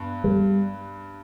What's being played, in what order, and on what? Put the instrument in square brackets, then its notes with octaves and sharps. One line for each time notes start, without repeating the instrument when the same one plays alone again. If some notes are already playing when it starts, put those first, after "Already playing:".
Already playing: [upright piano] G2 B3
[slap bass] G3